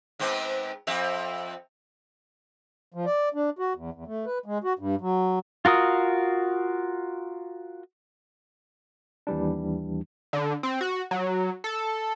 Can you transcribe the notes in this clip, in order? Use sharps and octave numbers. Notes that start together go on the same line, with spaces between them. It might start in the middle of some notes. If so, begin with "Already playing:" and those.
G#2 B3 C4
F2 C4 E5
F3
D5
D4
F#4
E2
E2
A3
B4
G#3
F#4
G2
F#3
F4 F#4 A#4 D#6
D#2 E3 G3 D4
D3
C4
F#4
F#3
A4